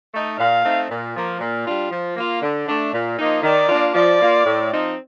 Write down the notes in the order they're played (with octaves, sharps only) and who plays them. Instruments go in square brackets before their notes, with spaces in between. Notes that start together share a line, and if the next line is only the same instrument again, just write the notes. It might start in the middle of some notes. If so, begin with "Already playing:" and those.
[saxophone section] A3 D#4
[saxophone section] A#2 [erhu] F5
[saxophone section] A3 C4 D#4
A#2
F3 A#3
A#2
G3 D4 F4
F3
A#3 F4
D3
A3 D4
A#2
F3 A#3 D#4
[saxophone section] D#3 [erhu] D5
[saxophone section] A#3 D4 F4
[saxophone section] F3 [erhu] D5
[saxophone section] A#3 F4
A2
F3 C4 D#4